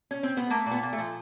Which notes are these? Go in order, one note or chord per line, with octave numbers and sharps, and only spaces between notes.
C#4
C4
B3
A3 A#3
A#2
B3
A#2
A3
F3